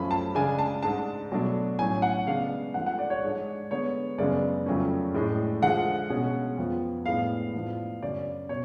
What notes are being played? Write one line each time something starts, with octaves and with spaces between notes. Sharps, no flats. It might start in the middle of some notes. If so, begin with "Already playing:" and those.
Already playing: F#2 F3 A3 C#4 B5
A5
C#3 G#3 D4 G#5
A5
G#2 G#3 D4 A5
B2 F#3 A3 D4
A2 F#3 C#4 G#5
F#5
C#3 G#3 B3 D4 F5
G#2 F3 A3 F#5
F#5
D5
C#5
G#2 G#3 D4
D3 G#3 B3 C#5
F#2 C#3 G#3 B3 D4 D5
F2 C#3 F#3 A3 C#4
A2 G#3 D4
D3 F3 G#3 F#5
B2 G#3 C#4
F2 F3 B3
A2 G#3 B3 D4 F5
A2 F3 B3 D4
F#2 C#3 F#3 C#4 D5
B2 C#5